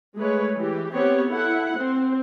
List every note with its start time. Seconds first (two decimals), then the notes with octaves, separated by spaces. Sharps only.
0.16 G#3 A3 B4 C#5
0.56 E3 G4
0.93 B3 C4 G4 C#5
1.29 E4 A4 F#5
1.78 C4 C5